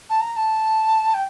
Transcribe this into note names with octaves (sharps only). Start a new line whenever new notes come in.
A5
A#5
A#5
A5
G5